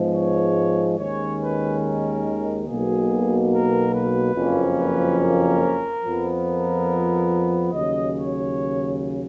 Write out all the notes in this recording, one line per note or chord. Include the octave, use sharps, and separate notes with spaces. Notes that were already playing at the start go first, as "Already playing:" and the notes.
Already playing: G#2 F3 G#3 B3
C#5
D#2 D#3 G#3 C#4 C#5
B4
A#4
B1 B2 A#3 G#4
A#4
B4
F#1 F2 F3 A#3 C#4
B4
A#4
F2 F3 B3
A#4
D#2 C#3 F#3 D#5
C#5